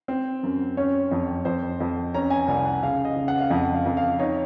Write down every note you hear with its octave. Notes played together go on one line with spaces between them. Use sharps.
C4
F#2
C#4 C#5
F2
F2 C5
F2
C#4 A#5
G#5
C2 G#5
F#5
C#3 F5
D#5
C#3
F#5
F5
F2 F#5
F5
F2
F5
D#4 C#5